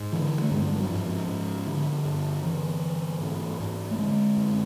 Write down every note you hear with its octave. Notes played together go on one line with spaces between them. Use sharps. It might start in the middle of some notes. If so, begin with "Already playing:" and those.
Already playing: G#2
D3 E3
A3
G2 G#3
G3
F#3
G#2 F3
G#2
D3
G2
D3 E3
G2
G#2
G#2
A3
D3 G#3
F#2